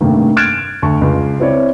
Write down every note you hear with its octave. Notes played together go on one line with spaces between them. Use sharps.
G2 C3 D#3 A3 A#3
F6 F#6 G#6 A6 D7 E7
D2 A5 C#6
C#2
C4 E4 C#5 D5